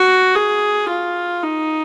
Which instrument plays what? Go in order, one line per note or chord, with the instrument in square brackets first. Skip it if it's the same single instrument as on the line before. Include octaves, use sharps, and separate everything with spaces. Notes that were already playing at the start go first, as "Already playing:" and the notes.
Already playing: [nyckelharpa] F#4
G#4
F4
D#4